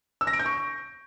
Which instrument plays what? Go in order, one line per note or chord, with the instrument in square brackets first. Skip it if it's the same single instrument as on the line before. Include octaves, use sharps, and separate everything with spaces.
[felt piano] E6
A#6
D7
G6
C#6